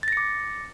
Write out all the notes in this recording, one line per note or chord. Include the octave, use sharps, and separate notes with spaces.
D6 A6 A#6 C#7